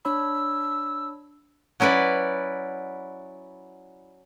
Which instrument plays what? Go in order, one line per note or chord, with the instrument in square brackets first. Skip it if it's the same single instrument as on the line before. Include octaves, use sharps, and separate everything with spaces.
[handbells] D4 C#5 B5 [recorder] E6
[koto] F#3 C#4 E4 B4 D5